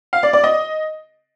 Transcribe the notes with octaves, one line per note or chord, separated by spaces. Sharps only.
F5
D5
D5
D#5